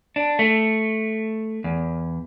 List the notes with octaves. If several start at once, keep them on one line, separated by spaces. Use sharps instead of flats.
D4
A3
E2